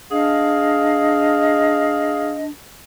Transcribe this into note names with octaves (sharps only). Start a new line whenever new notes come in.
D4 G#4 D#5 F5